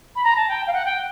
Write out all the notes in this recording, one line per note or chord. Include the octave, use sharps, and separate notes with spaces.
B5
A#5
A5
G5
F5
F#5
G5